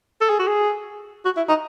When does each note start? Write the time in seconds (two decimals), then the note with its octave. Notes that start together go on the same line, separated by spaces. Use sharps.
0.21 A4
0.29 G#4
0.39 F#4
0.47 G#4
1.25 F#4
1.37 E4
1.49 D#4